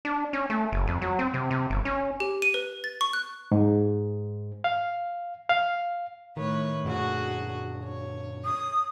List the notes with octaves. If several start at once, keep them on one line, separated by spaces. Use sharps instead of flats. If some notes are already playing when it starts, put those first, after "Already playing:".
D4
C#4
A3
F#1
F2
F#3
C4
C3
C3
G1
C#4
G4
D#7
B4
A6
C#6
F#6
G#2
F5
F5
A2 D#3 B4 C#5
F#2 A#2 D3 F#4 G#4
C#5
D#6